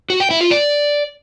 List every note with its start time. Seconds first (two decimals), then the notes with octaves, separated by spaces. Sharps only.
0.10 F#4
0.20 G5
0.30 E4
0.41 F4
0.51 D5